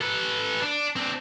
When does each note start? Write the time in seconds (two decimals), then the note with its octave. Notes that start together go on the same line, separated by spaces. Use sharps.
0.01 A4 B4
0.62 D4
0.96 C4 D4